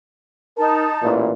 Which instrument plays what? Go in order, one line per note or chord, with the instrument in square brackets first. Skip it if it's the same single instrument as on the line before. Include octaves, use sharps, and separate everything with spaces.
[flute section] D#4 A5 [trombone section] A#4
[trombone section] A1 A#2 E3